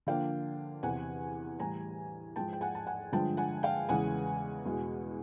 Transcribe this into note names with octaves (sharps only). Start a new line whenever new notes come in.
D3 F3 A#3 D4 F5 G5
E2 C3 E3 F#5 G#5
A2 E3 G3 G#5 A#5
G#2 F3 G#3 G5 A5
G5
F#5 G#5
A5
F#5 G#5
G2 D3 F3 G#3 G5 A5
F#5 G#5
F5 G5
E2 C#3 E3 G#3 F#5 G#5
E2 B2 G#3